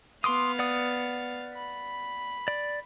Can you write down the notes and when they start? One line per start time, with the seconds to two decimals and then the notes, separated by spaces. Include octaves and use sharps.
0.24 B3 F5 C6 D6 D#6
0.59 D5 F#5 D#6
1.54 B5
2.48 D5